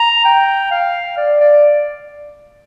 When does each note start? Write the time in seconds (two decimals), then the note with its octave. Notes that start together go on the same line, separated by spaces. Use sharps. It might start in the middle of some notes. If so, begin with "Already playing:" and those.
Already playing: A#5
0.25 G5
0.71 F5
1.17 D5
1.40 D5